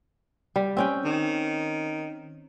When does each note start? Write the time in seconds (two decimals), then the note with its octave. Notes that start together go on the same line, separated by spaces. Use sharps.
0.56 G3
0.77 C4 C#4 G5
1.05 D#3